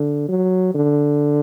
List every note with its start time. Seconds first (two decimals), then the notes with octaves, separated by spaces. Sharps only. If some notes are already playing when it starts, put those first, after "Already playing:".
Already playing: D3
0.29 F#3
0.75 D3